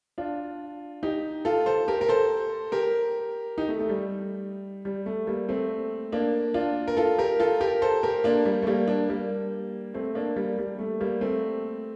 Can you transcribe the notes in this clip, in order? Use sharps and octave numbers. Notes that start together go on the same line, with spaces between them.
D4 F4
D#4 G4
F4 A4
A4 C5
G4 A#4
A#4
A4 C5
G4 A#4
D#4 G4
A3
A3
G3
G3
A3
G3 A#3
A3 C4
A#3 D4
D4 F4
A#4
F4 A4
G4 A#4
F4 A4
G4 A#4
A4 C5
G4 A#4
A#3 D4
G3 A#3
A3
G3 A#3
A#3 D4
G3 A#3
A3 C4
A#3 D4
G3 A#3
G3
A3
G3 A#3
A3 C4